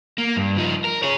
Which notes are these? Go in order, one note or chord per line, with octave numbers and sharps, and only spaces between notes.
A#3
G2
F3 D#4
A#4
G#4 C#5